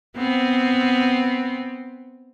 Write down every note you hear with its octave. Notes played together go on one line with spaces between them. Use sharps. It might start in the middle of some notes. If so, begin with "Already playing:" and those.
B3 C4